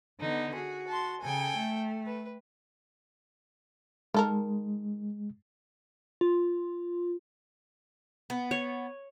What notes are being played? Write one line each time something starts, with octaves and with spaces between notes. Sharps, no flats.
D3 B3 D#4
F#4 G#4
A5 C6
C#3 A4 G5 G#5
A3
B4
D#3 G#3 A4 A#4
F4
B3
C#5